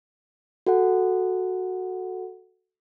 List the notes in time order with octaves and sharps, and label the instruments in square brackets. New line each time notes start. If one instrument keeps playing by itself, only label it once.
[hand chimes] F#4 A4 F#5